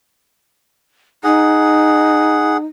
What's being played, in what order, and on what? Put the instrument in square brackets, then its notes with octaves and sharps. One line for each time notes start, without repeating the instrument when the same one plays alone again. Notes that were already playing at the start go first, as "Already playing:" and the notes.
[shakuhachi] D#4 [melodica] G#4 F#5